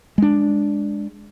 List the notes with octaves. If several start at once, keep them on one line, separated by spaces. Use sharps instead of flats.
G#3 D4